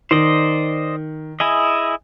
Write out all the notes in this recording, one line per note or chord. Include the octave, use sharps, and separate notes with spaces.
D#3 C5 D5 D#5
E4 G#4 D#5